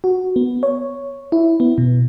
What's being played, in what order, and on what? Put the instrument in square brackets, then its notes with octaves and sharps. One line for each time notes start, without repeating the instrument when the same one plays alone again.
[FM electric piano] F#4
B3
C#5
E4
B3
B2